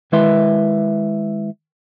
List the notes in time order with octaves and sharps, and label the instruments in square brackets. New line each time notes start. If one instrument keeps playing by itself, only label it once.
[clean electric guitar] D#3 G#3 E4 B4 E5 C6